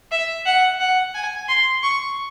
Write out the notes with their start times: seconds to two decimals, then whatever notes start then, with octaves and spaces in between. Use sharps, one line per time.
0.11 E5
0.46 F#5
0.80 F#5
1.14 G#5
1.48 C6
1.83 C#6